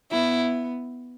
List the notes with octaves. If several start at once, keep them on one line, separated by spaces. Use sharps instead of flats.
B3 E4